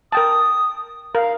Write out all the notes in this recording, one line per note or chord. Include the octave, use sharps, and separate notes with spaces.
A#4 G5 A5 D#6
A#4 F5